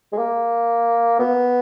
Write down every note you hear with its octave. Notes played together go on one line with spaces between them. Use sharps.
G#3
A#3
B3